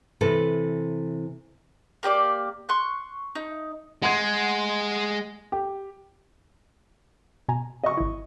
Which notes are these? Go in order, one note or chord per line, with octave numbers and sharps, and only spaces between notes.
C3 E3 A4 B4
A#3 G4 B4 D5
C6 C#6 F#6
D#4
G#3 F#5 C6 G#6
G4
B2 G#5 A#5
D#5 C#6
G#1 E4